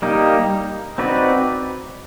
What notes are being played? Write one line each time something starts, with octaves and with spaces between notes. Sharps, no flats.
G3 A#3 D#4 G4
C4 D#4 F#4 B4 D5